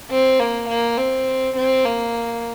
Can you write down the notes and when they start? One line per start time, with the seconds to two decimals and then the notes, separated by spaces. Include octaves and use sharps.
0.11 C4
0.40 A#3
0.69 A#3
0.98 C4
1.56 C4
1.85 A#3